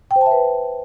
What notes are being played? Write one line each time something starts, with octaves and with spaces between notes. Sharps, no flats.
G5
C5
A5
E5
B4